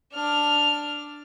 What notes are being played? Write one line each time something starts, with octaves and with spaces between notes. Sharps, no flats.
D4 F6